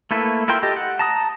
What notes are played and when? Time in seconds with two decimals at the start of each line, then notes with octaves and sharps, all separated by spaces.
0.11 A3 A#3 E4 A4 B4
0.48 E4 F4 A#4 G5 C6
0.63 G4 A4 D#5
0.76 F#5
0.99 A5 A#5 D#6